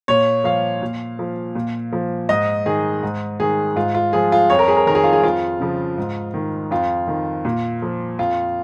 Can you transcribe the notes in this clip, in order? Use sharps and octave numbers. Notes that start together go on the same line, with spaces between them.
A#2 C#5
F3 F5
A#2
F3
A#2
F3
G#2 D#5
D#3 G#4
G#2
D#3 G#4
G#2 F4
F4
F3 G#4
F4
F2 C#5
A#4
G#4
A#4
D#3 A#4
G#4
F4
G#4
F2 F4
C#3 F3
G#2
D#3
F2 F4
D#3
A#2
F3
F2 F4